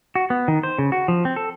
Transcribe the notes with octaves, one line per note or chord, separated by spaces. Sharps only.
F#4
B3
D#3
C5
C#3
F#4
F3
C4
A4